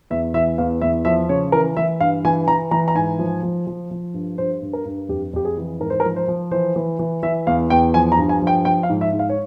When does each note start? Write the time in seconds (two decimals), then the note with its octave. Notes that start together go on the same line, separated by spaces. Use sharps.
0.10 E2 E5
0.34 E3 E5
0.58 E2 F5
0.82 E2 E5
1.05 F3 E5
1.29 C#3 C#5
1.52 E3 A#4
1.77 E3 E5
2.00 G2 F5
2.25 E3 G#5
2.47 E3 A#5
2.71 E3 A#5
2.88 A#5
2.95 G#2 G#5
3.19 F3
3.43 F3
3.67 F3
3.91 F3
4.14 G2
4.38 G2 C5
4.62 G2
4.73 A#4
4.85 G2
5.09 F2 G4
5.33 F2 G4
5.45 G#4
5.57 E3
5.80 G#2 A#4
5.90 C5
6.00 A#4
6.04 F3
6.16 C5
6.28 F3
6.51 E3 C5
6.76 E3
6.99 E3
7.23 E3 E5
7.47 E2 F5
7.70 E2 G5
7.94 F3 G#5
8.12 A#5
8.18 G2
8.29 G#5
8.42 F3
8.47 G5
8.65 F3 G5
8.83 F5
8.90 G#2
9.01 E5
9.13 G#2
9.19 F5
9.29 C#5